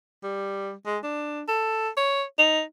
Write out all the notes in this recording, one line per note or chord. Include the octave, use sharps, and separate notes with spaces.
G3
G#3
D4
A4
C#5
D#4